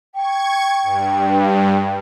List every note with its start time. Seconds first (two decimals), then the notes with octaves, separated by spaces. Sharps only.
0.14 G5 C#6 G#6
0.83 G2